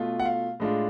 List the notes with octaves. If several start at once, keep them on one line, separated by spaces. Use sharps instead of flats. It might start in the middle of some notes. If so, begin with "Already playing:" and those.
Already playing: B2 A3 F4
F#5
F5
A2 G#3 D4 F4